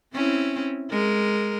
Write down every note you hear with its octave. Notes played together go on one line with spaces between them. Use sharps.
C4 C#4 E4
G#3 A#4